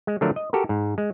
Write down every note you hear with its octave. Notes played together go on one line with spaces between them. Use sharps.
G#3
D3 F3 F#3 A3 A#4
D#5
F#4 G4 A4 A#4
G#2
G#3